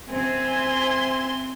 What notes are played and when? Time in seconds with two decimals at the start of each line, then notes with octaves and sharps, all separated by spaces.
0.11 C4 E5 G#5
0.47 C6